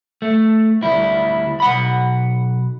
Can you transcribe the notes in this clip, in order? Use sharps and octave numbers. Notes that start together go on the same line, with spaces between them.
A3
D2 G3 E4
B1 F#5 B5